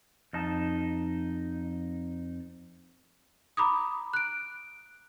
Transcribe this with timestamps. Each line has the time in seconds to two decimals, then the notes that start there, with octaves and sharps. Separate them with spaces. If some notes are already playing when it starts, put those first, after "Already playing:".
0.33 F2 D#4 A5
3.57 A#5 B5 D6 D#6
4.13 F#6 D7